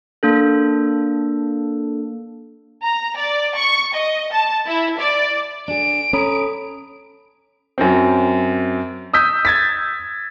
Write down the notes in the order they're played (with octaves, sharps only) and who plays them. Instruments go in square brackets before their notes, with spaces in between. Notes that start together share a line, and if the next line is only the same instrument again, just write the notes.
[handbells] A#3 D4 A4
[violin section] A#5
D5
C#6
D#5
A5
E4
D5
[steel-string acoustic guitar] D4 G#4 [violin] D7
[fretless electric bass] C#4 [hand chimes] A4 B5 D#6 [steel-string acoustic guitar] A#5
[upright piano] F#2 F#3 C4
D#6 E6 G6 B6
G#6 A6 B6